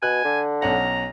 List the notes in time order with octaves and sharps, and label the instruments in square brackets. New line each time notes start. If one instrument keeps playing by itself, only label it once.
[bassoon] B2 [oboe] G#5 [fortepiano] F#6
[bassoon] D3
[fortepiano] B1 C#4 F#5 [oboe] A#5